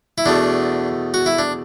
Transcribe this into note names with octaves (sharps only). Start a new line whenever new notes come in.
E4
E2 B2 A3 D4
F#4
E4
D4